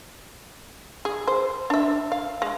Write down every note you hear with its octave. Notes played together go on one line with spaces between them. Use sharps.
G#4
C5
D4 E5
F5
G#3